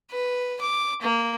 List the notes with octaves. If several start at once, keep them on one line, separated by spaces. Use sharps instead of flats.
B4
D6
A#3